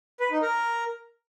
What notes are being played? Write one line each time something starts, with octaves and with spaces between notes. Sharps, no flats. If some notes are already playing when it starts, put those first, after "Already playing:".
B4
D#4
A#4